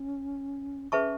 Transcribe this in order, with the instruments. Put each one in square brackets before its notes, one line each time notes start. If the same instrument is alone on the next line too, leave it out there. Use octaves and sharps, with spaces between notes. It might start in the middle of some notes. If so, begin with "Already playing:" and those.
Already playing: [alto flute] C#4
[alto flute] C#4 [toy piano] G#4 B4 E5 A5 C#6